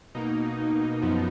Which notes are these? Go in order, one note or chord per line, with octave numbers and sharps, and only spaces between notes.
B2 A#3 D#4
F#2 F3 B3